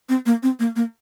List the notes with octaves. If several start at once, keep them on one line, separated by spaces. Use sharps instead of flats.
C4
A#3
C4
A#3
A#3